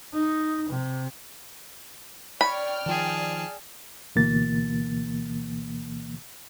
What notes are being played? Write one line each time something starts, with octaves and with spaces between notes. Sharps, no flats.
D#4
C3
C#5 D5 G5 B5 F6
D#3 F3 G#4 A5
D2 B2 E3 A#3 A6